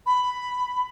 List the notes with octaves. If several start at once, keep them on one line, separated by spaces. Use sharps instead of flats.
B5